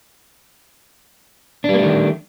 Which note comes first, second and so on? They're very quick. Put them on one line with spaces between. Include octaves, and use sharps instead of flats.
D4 G3 A#3 A3 D#3